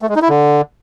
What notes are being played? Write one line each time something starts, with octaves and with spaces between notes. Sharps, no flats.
A3
G#3
D#4
E4
D3